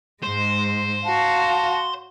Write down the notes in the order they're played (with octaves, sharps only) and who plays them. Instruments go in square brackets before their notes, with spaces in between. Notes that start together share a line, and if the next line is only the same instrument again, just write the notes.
[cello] G#2 G#3 [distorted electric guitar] C5
[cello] F#4 F5 [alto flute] A5